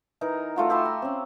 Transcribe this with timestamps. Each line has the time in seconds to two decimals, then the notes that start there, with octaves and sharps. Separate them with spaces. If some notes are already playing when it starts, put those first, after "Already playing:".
0.21 E3 D#4 A#4
0.56 A3 F4 F#4
0.70 G4 E5 B5 C6
0.85 A#5
1.02 C4 C#4